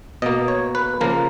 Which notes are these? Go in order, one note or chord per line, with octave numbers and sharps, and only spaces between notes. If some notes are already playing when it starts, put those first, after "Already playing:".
B2 A#3 D#5
C#5
B4
C#3 F3 A#3 A#4